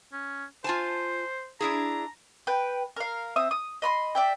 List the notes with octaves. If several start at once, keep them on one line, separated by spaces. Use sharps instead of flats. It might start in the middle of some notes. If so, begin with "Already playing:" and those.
C#4
F4 C5 G#5 A5
D4 E4 G#4 A#5
B4 G5
A#4 F5
C4 E5 D#6
D#6
D#5 B5 C6
D5 E5 G5